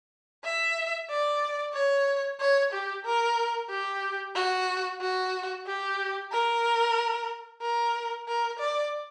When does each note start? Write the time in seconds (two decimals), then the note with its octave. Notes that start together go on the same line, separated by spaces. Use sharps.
0.44 E5
1.09 D5
1.74 C#5
2.40 C#5
2.72 G4
3.05 A#4
3.69 G4
4.35 F#4
5.00 F#4
5.66 G4
6.32 A#4
7.62 A#4
8.28 A#4
8.59 D5